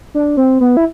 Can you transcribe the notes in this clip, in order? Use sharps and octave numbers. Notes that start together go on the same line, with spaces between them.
D4
C4
B3
E4